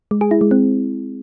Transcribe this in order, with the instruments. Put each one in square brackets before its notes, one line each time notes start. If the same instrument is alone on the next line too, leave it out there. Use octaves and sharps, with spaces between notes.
[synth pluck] G#3
G#4
E4
G#3
C4